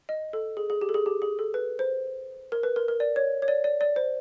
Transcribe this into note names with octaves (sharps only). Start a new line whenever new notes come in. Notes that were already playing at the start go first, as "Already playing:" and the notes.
D#5
A4
G#4
G#4
G4
A4
G#4
G4
G#4
A4
B4
C5
A#4
B4
A#4
A#4
D5
C#5
C#5
D5
D5
D5
C5